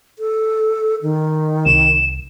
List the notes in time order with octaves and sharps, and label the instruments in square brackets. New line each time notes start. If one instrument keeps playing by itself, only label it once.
[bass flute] A4
D#3
[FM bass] C2 [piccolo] E7